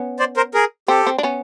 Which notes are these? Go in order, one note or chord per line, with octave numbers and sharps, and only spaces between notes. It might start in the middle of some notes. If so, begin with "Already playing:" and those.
Already playing: B3 C#4
C5 D5
A#4 C5
G#4 A#4
C4 G4 A4
C4
D4
B3 C#4